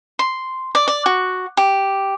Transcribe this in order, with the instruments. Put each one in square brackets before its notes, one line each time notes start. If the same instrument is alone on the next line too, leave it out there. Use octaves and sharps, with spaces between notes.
[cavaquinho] C6
D5
D5
F#4
G4